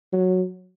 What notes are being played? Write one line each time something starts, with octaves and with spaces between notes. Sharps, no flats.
F#3